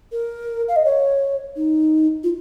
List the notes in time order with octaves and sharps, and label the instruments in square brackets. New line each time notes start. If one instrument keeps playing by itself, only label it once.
[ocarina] A#4
F5
D#5
C#5
D#4
F4